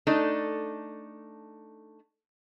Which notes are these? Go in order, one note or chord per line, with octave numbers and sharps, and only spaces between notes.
A3 D4 D#4 A4